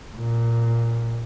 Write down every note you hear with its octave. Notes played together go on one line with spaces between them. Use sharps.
A#2